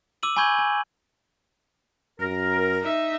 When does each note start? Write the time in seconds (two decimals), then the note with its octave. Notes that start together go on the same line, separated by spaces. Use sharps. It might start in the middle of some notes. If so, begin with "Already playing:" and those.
0.23 D6 E6 D#7 F#7
0.37 G#5 B5 C#6 G6 G#6 F#7
0.58 G#5
2.20 F#2 A#4
2.82 D#4 E5